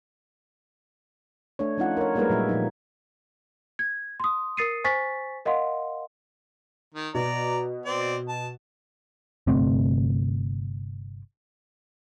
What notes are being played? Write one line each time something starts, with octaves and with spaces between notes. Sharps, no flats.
A3 D4 C#5
F3 A3 C#4 D#4 F4 F#5
A#4 C#5
G3 G#3 A#3 D#4 A#4 B4
A#2 F#3 G3 E5
A#2 F3 D#4
G#6
C6 D#6
A#4 D#6 A6 C7 C#7 D#7
C5 G#5 C#6 A6 B6
A#4 D#5 F5 F#5 C6
D#3
B2 D5 A#5
C4 D5
A5
G1 C3 A3 C4